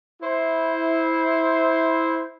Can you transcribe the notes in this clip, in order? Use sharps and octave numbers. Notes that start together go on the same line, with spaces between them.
E4 C5